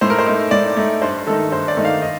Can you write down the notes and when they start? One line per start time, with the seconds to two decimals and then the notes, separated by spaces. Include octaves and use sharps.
0.01 A2 C5
0.10 A#4
0.19 C5
0.26 A3 D#4
0.51 A2 D5
0.77 A3 D#4
1.02 G2 C5
1.27 D#3 A3 D#4 A4
1.52 G2 C5
1.68 D5
1.77 D#3 A3 D#4
1.85 F5
2.02 D#5